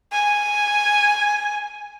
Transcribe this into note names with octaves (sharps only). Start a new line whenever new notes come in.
G#5